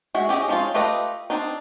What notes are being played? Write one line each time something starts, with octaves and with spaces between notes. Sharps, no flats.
G#3 F#4 E5
C#4 G4 G#4 D#5
F3 G#3 C4 C#4 F4
A3 F4 G4 B4 D#5
C4 D4 D#4